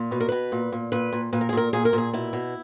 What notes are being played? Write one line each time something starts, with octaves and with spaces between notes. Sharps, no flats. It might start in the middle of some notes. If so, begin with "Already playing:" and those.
Already playing: A#2
B2 B4
A#4
B2 B4
A#2
A#2
A#2 B4
A#2
A#2 B4
A#4
G#4
A#2 A#4
A#2 G#4
A#4
A#2 G#4
B2 E4
B2